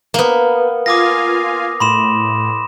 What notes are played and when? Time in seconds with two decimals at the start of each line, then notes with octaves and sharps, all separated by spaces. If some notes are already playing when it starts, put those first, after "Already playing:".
0.14 A#3 B3
0.86 F4 F5 G#5 D6 D#6 A#6
1.80 A2 B5 C6 E7